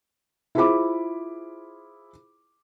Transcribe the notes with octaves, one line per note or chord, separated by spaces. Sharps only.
E4 F4 G#4 C5 B5 D6